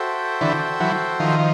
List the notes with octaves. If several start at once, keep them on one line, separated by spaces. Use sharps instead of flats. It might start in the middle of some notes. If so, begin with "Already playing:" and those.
Already playing: F#4 A4 C5 E5 G5
D3 E3
E3 F#3
D#3 F3